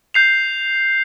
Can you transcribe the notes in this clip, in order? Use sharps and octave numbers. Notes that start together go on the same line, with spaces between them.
G6 C7 F7